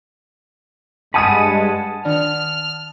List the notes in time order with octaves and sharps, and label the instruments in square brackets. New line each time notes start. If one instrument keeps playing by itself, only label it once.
[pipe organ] G2 G#3 [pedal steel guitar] F#5 G#5 B5 [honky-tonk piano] A5 D#6 D#7
[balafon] D#3 D4 D5 [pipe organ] F6